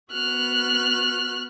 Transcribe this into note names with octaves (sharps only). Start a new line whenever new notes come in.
B3 F#4 F6 F#6